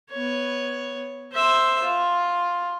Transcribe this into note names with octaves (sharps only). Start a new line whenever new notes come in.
B3 C#5
C5 E5
F4